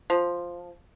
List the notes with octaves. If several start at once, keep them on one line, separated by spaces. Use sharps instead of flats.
F3